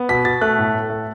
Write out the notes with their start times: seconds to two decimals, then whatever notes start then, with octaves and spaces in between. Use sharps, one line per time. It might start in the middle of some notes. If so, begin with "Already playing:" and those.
Already playing: B3
0.09 B2 B6
0.25 B2 A6
0.41 A3 F#6
0.58 A2
0.74 A2
0.90 A3